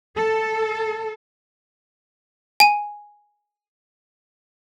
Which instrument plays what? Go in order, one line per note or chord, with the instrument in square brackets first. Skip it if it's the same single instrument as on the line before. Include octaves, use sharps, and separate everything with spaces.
[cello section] A4
[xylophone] G#5 D#7